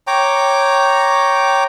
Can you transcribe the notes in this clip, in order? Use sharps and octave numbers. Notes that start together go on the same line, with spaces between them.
C#5 G5 A#5 D6